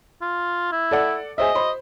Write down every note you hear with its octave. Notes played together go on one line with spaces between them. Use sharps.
F4
E4
A4 D5 F#5
G#4 C5 D#5 E5
C5 B5 C6